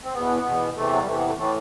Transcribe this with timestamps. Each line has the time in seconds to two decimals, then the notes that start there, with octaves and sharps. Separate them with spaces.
0.04 C4
0.14 E2 B2 B3
0.45 E2 B2
0.76 E2 C3 E3 A3
0.92 F#3
1.00 G3
1.06 E2 C3 E3 A3
1.17 B3
1.27 A3
1.37 A2 E3 A3